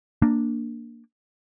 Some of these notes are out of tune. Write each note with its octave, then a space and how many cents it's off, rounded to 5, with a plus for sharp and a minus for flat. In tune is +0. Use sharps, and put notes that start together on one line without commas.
A#3 -5 D4 +0